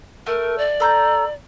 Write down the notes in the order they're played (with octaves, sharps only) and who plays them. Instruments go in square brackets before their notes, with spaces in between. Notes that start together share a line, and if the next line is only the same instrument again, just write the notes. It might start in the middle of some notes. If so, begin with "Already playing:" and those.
[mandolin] A3 [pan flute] A#4
[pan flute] D5
[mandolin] A4 A#5 G6